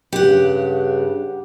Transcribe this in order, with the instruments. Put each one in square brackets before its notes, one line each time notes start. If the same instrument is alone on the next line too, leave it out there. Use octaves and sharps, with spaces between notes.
[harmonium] G2 C#3 [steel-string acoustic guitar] G4 F#5